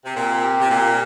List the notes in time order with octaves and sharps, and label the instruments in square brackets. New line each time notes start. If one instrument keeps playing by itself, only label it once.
[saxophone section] C3
[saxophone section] A#2 [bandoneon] C4
[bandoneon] G4
[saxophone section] C3
[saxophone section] A#2 [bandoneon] C4